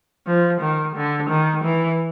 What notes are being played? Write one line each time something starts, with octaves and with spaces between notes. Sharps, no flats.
F3
D#3
D3
D#3
E3